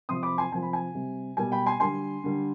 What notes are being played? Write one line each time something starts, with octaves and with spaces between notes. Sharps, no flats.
C3 F3 C6 D#6
B5 D6
G#5 C6
C3 F3 G#5
B5
G#5
C3 G3
B2 G3 G#5
G5 B5
G#5 C6
D3 G3 G#5 C6
D3 G3